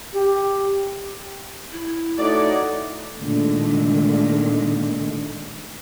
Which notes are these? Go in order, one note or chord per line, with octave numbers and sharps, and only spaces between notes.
G4
E4
A3 D#4 F#4 C#5 D5
A#2 D3 D#3 G#3 A3